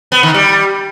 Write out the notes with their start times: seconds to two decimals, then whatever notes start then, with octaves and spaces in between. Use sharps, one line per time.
0.12 B3
0.23 D#3
0.34 G3